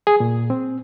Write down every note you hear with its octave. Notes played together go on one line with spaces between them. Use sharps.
G#4
A#2
C4